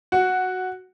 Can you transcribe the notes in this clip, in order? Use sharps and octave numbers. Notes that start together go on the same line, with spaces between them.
F#4